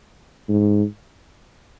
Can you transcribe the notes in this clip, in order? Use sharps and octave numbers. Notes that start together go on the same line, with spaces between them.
G#2